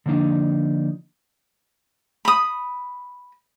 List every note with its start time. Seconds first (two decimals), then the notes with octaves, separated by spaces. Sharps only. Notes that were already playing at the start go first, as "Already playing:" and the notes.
0.06 D3 F3 A#3 D4 D#4
2.25 B5 D#6